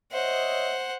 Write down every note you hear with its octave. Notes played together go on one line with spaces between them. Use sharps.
C5 C#5 D#5 E5 F#5